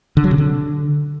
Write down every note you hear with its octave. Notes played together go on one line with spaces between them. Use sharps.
D3
F#3
C3
D3